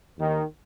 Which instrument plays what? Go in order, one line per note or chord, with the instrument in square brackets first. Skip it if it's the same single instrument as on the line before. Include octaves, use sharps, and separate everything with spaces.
[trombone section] D#2 D#3